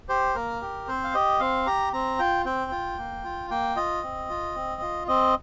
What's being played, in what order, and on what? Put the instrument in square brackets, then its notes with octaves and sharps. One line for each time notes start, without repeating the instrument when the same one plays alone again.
[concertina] G4 C5
A#3 A#4
G4
C4 C5
F5
G4 D#5
C4 F5
G4 A#5
C4 A#5
F4 G5
C4 G5
F4
A#3
F4
A#3 G5
F4 D#5
C4
F4
C4
F4
C4 D#5